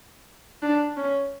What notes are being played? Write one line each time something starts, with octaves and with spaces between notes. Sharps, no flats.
D4
C#4